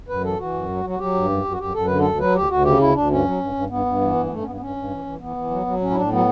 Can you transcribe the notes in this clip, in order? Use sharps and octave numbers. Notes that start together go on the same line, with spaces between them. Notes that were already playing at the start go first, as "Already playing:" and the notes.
F#2 B4
E3 A4
E3 F#4
F#2
F#3
F#3
F#4
F#3 G4
G2
F#2
F#2
F#4
F#2 G4
F#2 A4
D3 B4
D2 A4
F#3 B4
D2 G4
D2 F#4
C#3 G4
D2 E4
D2 D4
G2 C#4
F#3
G2
G2
G2 B3
G2
E3
G2
B3
G2 A3
C#4
G2 B3
B3
G2 C#4
G2
E3
E3
E3 B3
E3
F#3
F#3
A2 C#4
E4
A2 D4
F#3 B3